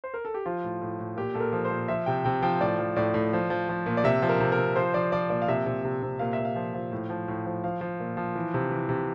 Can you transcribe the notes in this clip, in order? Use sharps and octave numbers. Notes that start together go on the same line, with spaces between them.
C5
A#4
A4
G4
F3 F4
A2
A2
A2
A#2 G4
A#2 A4
A#4
F3
C5
A#2
F3 E5
C3 G5
C3 G5
F3 G5
A2 D5
F3
A2 D5
A2
F3
F3
F3
A#2
D5
C3 E5
F3
A#4
C3
A#4
C3
F3 C5
F3 D5
F3 D5
A#2 D5
F5
C3 E5
C3
C3
C3
A#2 F5
E5
A#2
F5
F3
F3
A2
F3
A2
F3
F3 F5
F3
A#2
F3
E3
C3
E3
C3